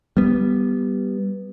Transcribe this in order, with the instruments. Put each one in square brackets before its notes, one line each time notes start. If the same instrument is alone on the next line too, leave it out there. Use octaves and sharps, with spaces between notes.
[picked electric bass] G3 B3